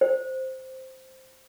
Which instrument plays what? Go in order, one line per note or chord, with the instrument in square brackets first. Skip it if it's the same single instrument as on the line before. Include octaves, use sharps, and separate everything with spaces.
[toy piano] C5